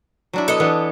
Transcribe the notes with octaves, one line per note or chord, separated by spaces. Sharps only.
F#3 D4 E4
B3 A4 D#5
E3 B3 D4